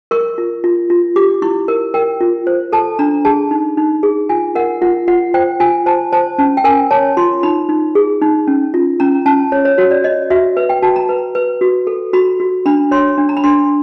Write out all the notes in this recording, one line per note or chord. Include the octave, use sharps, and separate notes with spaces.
A#4 C#6
F4
F4
F4
G4 D6
E4 C#6
A#4
A#4 G5
F4
C5
A4 A5
D4 A#5
G#4 A5
D#4
D#4
G#4
F4 G#5
A#4 F#5
F4 F#5
F4 F#5
C5 G5
F4 G#5
C5 A5
C5 A5
C#4 A5
G5
A#4 G#5
C#5 A5
F4 C6
D#4 B5
D#4
G#4
D#4
C#4
F4
C#4 A#5
C#4 A5
C#5
C#5
F#4 C#5
D5
C#5 D#5
F#4 E5
B4
G5
F#4 A5
A#5
B4
B4
F#4
A4
F#4 B5
F#4
D4 B5
C#5 C6
D4
A#5
B5
D4 C6